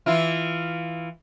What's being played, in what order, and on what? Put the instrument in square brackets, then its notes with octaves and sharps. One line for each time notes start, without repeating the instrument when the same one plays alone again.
[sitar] E3 E4 F4